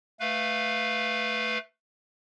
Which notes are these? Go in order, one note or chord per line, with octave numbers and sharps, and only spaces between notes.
A3 B4 F5